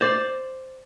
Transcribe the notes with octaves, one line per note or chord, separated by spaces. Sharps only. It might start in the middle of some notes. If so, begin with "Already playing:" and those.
C5 D5